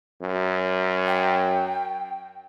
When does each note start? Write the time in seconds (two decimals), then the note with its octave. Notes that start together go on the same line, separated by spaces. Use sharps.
0.22 F#2
1.07 G5